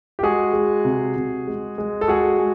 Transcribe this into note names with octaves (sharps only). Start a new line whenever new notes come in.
G4
G#3 F#4 G#4
G#3
C3
C3
G#3
G#3
A4
G#3 F#4 G#4
G#3